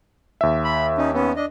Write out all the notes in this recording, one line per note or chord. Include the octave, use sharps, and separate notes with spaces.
D#2 E5
B5
C#4 D#4
B3 C#4
D4 D#5